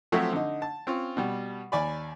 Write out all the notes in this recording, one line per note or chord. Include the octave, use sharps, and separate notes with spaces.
F3 F#3 A3 C4 E5
D3 D#4
A5
C4 C#4 F4
B2 G3
D#2 D5 G#5 B5